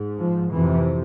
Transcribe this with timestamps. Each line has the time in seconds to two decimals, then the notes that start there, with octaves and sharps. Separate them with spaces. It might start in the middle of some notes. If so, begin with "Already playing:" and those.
Already playing: G#2
0.19 F3
0.52 F2 C3 E3